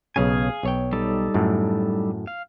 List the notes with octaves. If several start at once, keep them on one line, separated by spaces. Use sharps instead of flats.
B1 C#3 G#4 F5 G#5
B1 C#5 G5
G3 D#4 A4
F#2 A2
F5